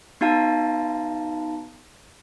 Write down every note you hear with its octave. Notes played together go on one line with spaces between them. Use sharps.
B3 D#4 F#4 F5 A5 A#5